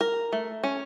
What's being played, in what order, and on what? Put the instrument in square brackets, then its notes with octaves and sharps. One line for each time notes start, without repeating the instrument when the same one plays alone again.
[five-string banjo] A#4
A3
C#4